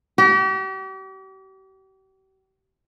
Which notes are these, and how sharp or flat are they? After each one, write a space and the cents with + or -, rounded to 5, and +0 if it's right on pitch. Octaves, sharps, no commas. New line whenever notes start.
G4 -40